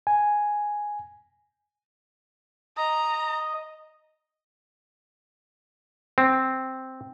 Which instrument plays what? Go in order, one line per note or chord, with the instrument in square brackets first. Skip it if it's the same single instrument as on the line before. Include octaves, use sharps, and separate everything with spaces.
[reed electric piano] G#5
[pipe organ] D#5 [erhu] A#5
[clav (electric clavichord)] C4